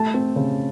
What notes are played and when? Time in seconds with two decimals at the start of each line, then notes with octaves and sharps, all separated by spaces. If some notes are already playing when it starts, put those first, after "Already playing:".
Already playing: A3 A5
0.14 C4
0.36 C#3